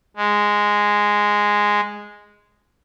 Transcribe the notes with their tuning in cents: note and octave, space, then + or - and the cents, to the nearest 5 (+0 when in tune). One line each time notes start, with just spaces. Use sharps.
G#3 -5